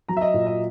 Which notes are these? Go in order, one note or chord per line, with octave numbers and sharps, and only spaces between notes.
F#3 A#5
E5
D#5
A#2
D#5